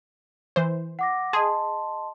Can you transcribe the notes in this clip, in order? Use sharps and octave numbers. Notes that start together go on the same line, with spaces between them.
E3 C5
F#5 D6 A#6
G#4 D#5 A5 C6